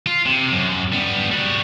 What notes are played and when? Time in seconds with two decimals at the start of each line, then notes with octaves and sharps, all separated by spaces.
0.06 F4
0.25 C3
0.52 F#2
0.93 G3 B3
1.31 G3 F#4